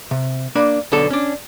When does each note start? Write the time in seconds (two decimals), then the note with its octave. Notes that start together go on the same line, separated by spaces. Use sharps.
0.11 C3
0.55 A#3 D4 B5
0.92 B1 B2 D3 A4
1.10 C#4 D4